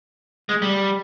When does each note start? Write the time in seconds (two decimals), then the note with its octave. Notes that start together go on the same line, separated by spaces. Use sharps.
0.49 G#3
0.62 G3